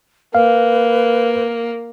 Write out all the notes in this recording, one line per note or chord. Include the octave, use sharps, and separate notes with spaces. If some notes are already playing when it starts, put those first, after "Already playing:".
A#3 B4 F5